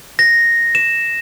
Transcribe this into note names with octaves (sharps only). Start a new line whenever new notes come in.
A#6
E7